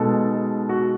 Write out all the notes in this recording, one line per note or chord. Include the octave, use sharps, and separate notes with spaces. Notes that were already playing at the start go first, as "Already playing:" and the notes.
Already playing: B2 G#3 D#4 A4
F#4